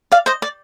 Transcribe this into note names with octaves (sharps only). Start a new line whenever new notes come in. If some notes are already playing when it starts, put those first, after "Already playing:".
D5 F5
C5 D#5
D5